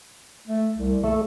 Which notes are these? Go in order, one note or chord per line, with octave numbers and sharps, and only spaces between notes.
A3
C2
A3 A4